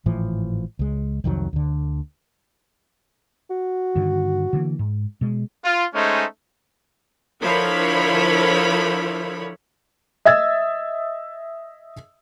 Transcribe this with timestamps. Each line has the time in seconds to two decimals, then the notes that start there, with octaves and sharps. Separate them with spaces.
0.06 G#1 A2 E3 F3
0.79 C#2 G#3
1.24 C2 F2 D#3 F#3
1.53 D2 D3
3.50 F#4
3.96 G2 D3 D#3
4.53 D3 E3 A#3
4.79 G#2
5.21 B2 G#3
5.64 F4
5.94 G#3 A3 C#4 D#4 C5
7.41 D3 F3 E4 A#4 C#5 B5
10.25 D#5 E5 E6 G#6 A6